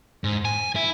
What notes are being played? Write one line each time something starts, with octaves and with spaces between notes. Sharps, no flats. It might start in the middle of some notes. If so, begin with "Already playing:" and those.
G#2
G#5
E4